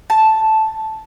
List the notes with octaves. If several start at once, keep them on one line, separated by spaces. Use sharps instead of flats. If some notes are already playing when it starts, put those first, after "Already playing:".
A5